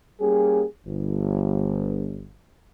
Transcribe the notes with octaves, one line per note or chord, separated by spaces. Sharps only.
G3 A#3 C#4 G4 G#4
G1